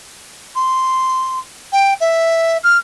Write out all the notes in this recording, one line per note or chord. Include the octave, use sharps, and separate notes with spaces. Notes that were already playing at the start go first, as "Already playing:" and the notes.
C6
G5
E5
F6